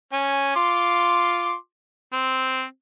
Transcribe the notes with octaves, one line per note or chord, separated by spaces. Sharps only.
C#4 G#5
F4 C6 D6
C4